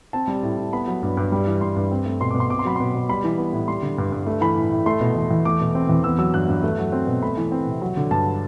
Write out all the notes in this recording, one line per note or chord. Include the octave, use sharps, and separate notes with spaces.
C4 A5
G3
A2
A2
B3 B5
F#3
G2
G2
G3
E3
G2 C6
G2
C4
A3
B2 C6
D6
B2
C6
C4 D6
C6
F#3 B5
B2 C6
B2
G3 B5
E3
B3
A2
G3 C6
D3
G2
G2
A3
E3 B5
A2
A2
A3 C6
B2
E2
E2
A3 D6
B2
C4
E2
B3 E6
F#3 E6
G2 F#6
G2
A3
F#3
C4
B2
A3 B5
E3
C4
C3
F#3
D3
G2 A5